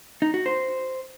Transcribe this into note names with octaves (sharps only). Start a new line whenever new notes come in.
D#4
F#4
C5